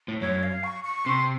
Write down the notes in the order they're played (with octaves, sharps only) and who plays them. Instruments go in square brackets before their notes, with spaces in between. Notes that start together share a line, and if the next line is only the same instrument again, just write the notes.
[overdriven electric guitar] A2
[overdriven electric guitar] F#2 [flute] C#5
[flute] F5
C#6
C#6
[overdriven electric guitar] C3 [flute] C6